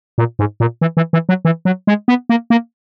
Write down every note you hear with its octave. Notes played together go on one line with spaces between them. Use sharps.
A#2
G#2
A#2
E3
E3
E3
F#3
E3
F#3
G#3
B3
A#3
A#3